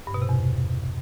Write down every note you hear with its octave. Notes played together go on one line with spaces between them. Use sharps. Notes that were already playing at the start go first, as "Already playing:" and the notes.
G2
B2
C3
E2